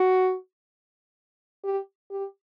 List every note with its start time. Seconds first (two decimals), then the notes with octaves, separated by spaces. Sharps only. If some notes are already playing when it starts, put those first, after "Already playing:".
Already playing: F#4
1.64 G4
2.11 G4